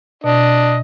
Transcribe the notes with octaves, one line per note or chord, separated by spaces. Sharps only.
B2 D4 D#5